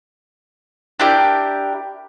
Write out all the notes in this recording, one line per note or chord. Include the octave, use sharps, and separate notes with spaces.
D4 E4 G4 A#4